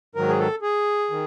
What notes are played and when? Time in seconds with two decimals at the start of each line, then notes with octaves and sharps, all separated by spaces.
0.15 G#2 D#3 F#3 A#4
0.29 G#4
0.39 A4
0.62 G#4
1.11 D#3